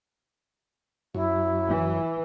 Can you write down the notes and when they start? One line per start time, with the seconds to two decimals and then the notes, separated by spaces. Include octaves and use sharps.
1.15 F#2 E4
1.68 E3